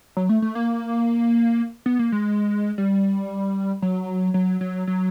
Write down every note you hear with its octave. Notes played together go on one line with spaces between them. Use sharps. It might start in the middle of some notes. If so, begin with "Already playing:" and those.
F#3
A3
A3
A#3
B3
A#3
G#3
G3
F#3
F#3
F#3
F#3